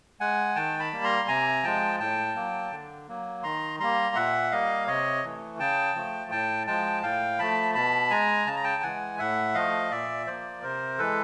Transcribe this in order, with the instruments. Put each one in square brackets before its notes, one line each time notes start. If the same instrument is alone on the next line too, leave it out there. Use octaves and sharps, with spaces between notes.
[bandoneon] G#3 F#5 G#5
D#3 G5 A5
A5 B5
G3 A#3
A#5 C6
C3 G#5 A#5
F3 G#3 G5 A5
A2 G5 A5
F#3 A#3
D3
F#3 A#3
D#3 A#5 C6
G3 A#3 A#5 C6
A#2 E5 F#5
G3 A#3 D#5 F5
C3 C#5 D#5
E3 A3
C#3 G5 A5
F3 A3
A2 G5 A5
F3 G#3 G5 A5
A2 F5 G5
F3 A3 A5 B5
B2 A5 B5
G#3 G#5 A#5
C#3 A5
A#5
G5 A5
E3 G#3 F#5 G#5
A2 E5 F#5
F3 A3 D#5 F5
A#2 D5 E5
F3 A#3 C5 D5
C3 A#4 C5
E3 G#3 A4 B4